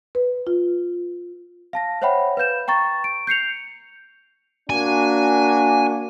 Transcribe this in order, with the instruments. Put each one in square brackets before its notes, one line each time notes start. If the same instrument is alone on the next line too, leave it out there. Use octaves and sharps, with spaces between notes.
[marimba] B4
F4
[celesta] F5 A5 A#6
C5 C#5 E5 F#5 G5 B5
B4 F5 G6 E7
G5 A#5 C#6 A6
D7
G6 C7 C#7 F7
[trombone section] A#3 D4 F#4 [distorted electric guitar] G#5